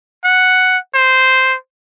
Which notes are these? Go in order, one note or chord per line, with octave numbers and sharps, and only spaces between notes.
F#5
C5